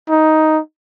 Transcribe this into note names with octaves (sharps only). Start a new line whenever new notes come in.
D#4